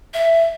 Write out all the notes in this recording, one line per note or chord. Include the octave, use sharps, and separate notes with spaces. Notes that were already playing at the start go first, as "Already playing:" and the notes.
E5